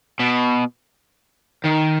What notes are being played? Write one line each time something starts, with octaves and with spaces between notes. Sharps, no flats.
B2
D#3